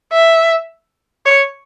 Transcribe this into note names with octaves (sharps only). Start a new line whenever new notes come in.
E5
C#5